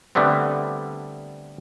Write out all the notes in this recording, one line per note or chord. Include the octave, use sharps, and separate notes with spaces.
D3 G3 A3 B3 C4